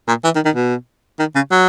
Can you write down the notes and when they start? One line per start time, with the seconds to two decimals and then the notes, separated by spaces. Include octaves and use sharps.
0.08 A#2
0.24 E3
0.35 D#3
0.45 D#3
0.55 B2
1.19 D#3
1.35 C#3
1.51 F#3